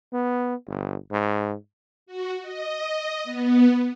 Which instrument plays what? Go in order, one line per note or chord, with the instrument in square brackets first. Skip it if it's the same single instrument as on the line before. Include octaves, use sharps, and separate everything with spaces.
[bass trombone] B3
G1
G#2
[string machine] F#4
D#5
B3